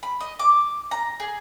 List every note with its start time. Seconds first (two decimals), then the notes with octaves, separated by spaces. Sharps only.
0.03 B5
0.20 D#5
0.39 D6
0.91 A#5
1.20 G#4